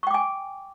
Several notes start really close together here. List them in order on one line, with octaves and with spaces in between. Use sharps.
C#6 G5 D6 G#5